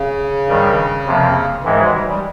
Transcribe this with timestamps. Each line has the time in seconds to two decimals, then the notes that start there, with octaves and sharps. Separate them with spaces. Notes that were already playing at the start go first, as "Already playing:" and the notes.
Already playing: C#3
0.49 G2 D#3 G3
1.06 F2 C3 F3 A#3
1.63 G#2 D#3 E3 G#3
1.78 F#3
1.93 G3
2.06 G3